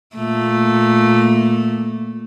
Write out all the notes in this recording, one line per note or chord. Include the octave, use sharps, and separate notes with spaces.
A#2 A3